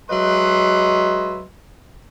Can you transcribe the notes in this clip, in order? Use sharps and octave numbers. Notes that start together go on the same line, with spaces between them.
F#3 G#3 B4 D#5 E5 C6